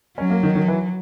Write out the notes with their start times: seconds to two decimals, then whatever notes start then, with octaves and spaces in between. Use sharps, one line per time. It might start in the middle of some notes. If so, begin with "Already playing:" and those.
0.18 F#3 C#4
0.30 A#3
0.43 D#3
0.55 D#3
0.68 E3